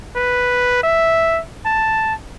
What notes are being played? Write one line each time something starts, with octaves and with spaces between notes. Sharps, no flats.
B4
E5
A5